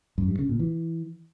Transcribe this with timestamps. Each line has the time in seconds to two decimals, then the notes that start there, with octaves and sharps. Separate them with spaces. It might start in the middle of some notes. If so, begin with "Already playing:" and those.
0.18 F#2
0.28 G2
0.39 C#3
0.49 A#2
0.60 E3